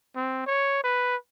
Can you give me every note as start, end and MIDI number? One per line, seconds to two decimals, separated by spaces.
0.16 0.46 60
0.47 0.84 73
0.84 1.16 71